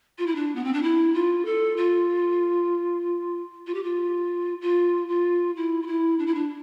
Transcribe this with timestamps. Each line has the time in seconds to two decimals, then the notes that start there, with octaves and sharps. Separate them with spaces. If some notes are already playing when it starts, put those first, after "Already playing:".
0.18 F4
0.26 E4
0.35 D4
0.55 B3
0.64 C4
0.73 D4
0.82 E4
1.14 F4
1.45 A4
1.77 F4
3.67 F4
3.74 G4
3.83 F4
4.61 F4
5.08 F4
5.56 E4
5.82 F4
5.87 E4
6.19 D4
6.26 E4
6.35 D4